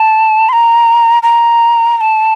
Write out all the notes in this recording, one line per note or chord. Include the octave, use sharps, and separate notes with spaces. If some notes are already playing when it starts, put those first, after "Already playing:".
Already playing: A5
C6
A#5
A#5
A#5
A5